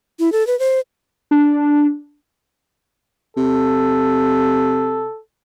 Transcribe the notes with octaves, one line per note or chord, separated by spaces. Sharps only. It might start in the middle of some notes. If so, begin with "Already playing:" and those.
E4
A4
B4
C5
D4
C3 A4